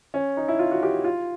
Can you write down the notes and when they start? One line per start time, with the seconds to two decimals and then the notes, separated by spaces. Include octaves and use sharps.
0.14 C#4
0.37 D#4
0.48 E4
0.59 F4
0.71 F#4
0.83 G4
1.04 F4